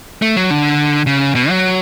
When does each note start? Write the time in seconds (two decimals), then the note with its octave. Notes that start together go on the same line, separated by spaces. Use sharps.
0.22 A3
0.37 F#3
0.50 D3
1.07 C#3
1.35 B2
1.49 F#3